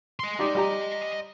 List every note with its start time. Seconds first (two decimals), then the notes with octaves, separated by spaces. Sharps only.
0.20 D#5 C6
0.39 D#4 G4 D5
0.55 G3 G4 A#5